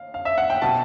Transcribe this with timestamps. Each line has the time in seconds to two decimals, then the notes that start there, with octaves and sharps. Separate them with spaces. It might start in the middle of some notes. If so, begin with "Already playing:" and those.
Already playing: F5
0.14 F5
0.25 E5
0.38 F#5
0.50 G5
0.62 B2 F#3 A5